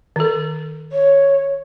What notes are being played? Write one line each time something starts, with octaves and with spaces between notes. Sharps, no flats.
D#3 A4
C#5